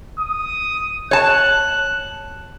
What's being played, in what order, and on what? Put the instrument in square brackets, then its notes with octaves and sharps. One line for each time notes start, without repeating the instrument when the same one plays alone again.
[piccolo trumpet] D#6
[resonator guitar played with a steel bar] C#5 A5 [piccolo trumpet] F#6